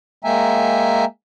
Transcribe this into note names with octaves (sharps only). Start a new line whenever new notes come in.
G#3 A#3 E5 G5 G#5 A#5